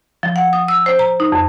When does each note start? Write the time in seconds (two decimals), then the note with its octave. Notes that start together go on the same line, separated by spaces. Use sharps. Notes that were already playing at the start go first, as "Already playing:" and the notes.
0.23 F3
0.36 F#5
0.53 D#6
0.68 E6
0.86 C5
0.99 A#5
1.20 D#4
1.32 F2